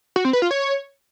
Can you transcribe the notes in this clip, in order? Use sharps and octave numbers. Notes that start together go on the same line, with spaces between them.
F#4
C4
B4
F4
C#5